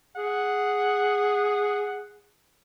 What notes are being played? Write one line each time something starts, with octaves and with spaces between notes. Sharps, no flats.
G#4 F#5